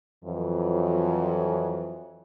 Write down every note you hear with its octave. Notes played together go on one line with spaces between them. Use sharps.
F2 E3 F#3